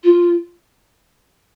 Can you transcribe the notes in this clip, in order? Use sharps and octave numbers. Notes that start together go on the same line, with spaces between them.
F4